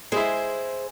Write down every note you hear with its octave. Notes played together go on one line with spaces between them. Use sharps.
G#3 E4 G#4 C5